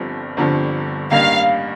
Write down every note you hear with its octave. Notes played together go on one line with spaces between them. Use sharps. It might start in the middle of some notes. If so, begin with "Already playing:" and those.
Already playing: G1 G2 D3 F3 C4
G1 G2 D3 F3 C4
A1 G2 D#3 A#3 F5